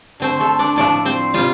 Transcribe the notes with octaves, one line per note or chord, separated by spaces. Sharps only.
D3 A3 C4 C5
A3 A4
D4 D5
A2 F3 A3 D4 D5
C4 C5
C3 G3 F4 F5